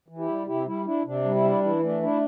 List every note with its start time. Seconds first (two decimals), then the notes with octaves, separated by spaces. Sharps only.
0.08 E3
0.18 E4 G4
0.28 G3
0.47 C3 E4 G4
0.67 G3 E4
0.86 D4 E4
1.05 C3 D4
1.24 G3
1.35 E4
1.44 D4
1.64 E3 E4
1.83 A3 D4
2.03 D4 E4